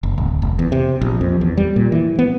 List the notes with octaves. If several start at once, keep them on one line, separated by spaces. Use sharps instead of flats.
F#1
D1
F1
E2
C3
A#1
F2
E2
G3
A#2
E3
B3